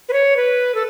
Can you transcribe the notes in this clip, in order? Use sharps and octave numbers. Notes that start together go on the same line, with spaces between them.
B4
C#5
B4
A4